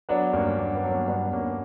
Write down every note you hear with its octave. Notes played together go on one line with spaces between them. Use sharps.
F#3 B3 D4
G2 A#3 C#4
G2 B3
B3
F#3
A#3 C#4
G2 B3 D4
G2 A#3 C#4